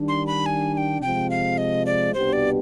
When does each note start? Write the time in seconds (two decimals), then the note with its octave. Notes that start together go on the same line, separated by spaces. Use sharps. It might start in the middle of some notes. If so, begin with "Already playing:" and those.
Already playing: D#3 G3 D4
0.08 C6
0.27 B5
0.46 G#5
0.74 G#5
0.77 G5
1.01 C3 F3 G#3 G5
1.30 F5
1.58 D#5
1.86 D5
2.14 C2 B2 B3 D4 G4 C5
2.33 D5